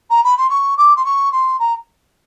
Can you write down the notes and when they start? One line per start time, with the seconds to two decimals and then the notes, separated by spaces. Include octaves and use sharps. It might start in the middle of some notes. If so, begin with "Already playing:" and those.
0.10 A#5
0.24 B5
0.37 C6
0.49 C#6
0.77 D6
0.96 C6
1.05 C#6
1.32 C6
1.59 A#5